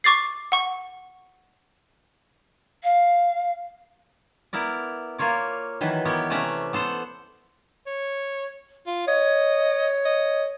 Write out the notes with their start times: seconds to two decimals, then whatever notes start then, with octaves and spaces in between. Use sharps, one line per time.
0.04 C#6 D6 A6 C7
0.52 F#5 C#6
2.83 F5
4.53 B3 E4 A#4 D5
5.18 A#3 F4 A#4 C#5 D5
5.81 D#3 E3 F#3 B4
6.05 B3 G4 A#4 C#5
6.30 C3 A3 C#4 B4 D5 A#5
6.73 B3 A4 C5 F#5
7.87 C#5
8.86 F4
9.08 C#5 D#5
10.05 D#5